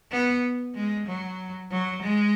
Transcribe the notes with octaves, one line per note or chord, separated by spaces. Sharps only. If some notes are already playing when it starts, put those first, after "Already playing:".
B3
G#3
F#3
F#3
G#3